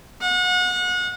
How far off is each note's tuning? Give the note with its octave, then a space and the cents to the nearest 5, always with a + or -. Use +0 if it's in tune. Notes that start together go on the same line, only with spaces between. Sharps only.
F#5 -35